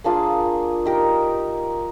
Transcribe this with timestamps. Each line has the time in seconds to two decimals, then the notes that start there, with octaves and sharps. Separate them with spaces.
0.04 A#3 D4 F4 G#4
0.85 D#4 G4 A#4